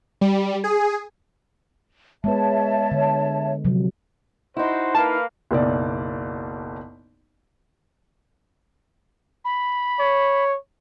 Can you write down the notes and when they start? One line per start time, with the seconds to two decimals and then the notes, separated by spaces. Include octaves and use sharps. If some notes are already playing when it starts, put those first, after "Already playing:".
0.21 G3
0.64 G#4
2.24 G#3 B3 B4 C#5 E5 A5
2.92 D3
3.65 C3 F3 F#3
4.57 D#4 E4 F#4 C5
4.95 A#3 B4 F5 A5
5.51 F#1 B1 D5
9.45 B5
9.99 C#5